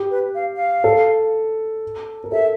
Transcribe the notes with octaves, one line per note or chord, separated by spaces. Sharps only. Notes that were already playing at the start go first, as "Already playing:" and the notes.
Already playing: G4
B4
F5
F5
A4
A#4
A4 E5